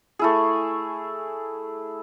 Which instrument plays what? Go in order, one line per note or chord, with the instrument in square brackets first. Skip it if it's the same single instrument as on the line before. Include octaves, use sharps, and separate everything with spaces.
[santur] A3 E4 G#4